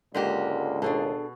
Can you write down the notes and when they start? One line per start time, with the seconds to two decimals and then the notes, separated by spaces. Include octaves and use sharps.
0.14 C#2 G#2 D3 A#3 G4
0.82 D#2 B2 D4 G#4 A4